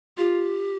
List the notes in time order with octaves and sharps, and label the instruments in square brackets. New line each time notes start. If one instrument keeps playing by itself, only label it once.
[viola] F4 [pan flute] G4